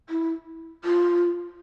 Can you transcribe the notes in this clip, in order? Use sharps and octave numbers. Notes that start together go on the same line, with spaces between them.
E4
F4